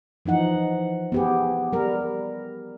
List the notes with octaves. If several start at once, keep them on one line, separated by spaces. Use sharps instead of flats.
E3 F3 D#4 F#5
B3 G4 G#4
G3 A#4